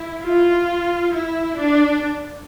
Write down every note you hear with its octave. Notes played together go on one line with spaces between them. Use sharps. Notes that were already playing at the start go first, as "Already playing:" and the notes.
Already playing: E4
F4
E4
D4